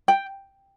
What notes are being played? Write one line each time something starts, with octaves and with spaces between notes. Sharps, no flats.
G5